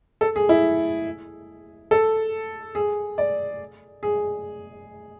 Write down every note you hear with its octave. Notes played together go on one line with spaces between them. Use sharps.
A4
G#4
E4
A4
G#4
D5
G#4